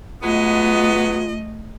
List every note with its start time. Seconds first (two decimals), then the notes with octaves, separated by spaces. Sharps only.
0.22 F#3 G#3 A3 B3 F4 D#5